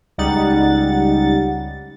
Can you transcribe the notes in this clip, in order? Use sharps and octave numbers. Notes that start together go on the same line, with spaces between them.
C#2 G3 D#4 F#5 A6